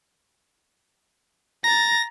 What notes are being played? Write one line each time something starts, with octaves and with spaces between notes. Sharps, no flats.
A#5 A6 A#6